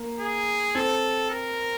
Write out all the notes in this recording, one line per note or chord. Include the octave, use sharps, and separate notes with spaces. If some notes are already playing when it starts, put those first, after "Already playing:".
Already playing: A#3
G#4
C4 A4
A#4